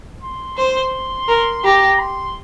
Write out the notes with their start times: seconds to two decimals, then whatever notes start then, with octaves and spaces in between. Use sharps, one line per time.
0.22 C6
0.57 C5 C6
1.28 A#4
1.64 G4 A#5
1.99 C6